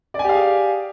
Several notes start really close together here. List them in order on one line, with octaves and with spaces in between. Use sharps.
D5 G#5 G4 F5 G#4